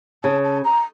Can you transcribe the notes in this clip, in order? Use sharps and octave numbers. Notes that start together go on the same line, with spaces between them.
C#3 A5
A5
A#5